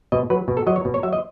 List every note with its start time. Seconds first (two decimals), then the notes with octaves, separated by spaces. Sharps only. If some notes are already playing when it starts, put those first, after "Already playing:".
0.12 B2 D#5
0.30 F#3 B4
0.48 B2
0.57 A4
0.67 F#3 D#5
0.76 C#5
0.85 B2
0.94 C#5
1.03 F#3 E5
1.13 D#5